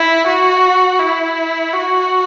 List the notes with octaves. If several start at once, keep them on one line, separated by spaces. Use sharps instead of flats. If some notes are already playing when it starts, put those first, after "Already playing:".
Already playing: E4
F#4
E4
F#4